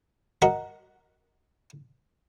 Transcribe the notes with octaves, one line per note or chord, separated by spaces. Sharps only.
F#4 A#4 D#5 F#5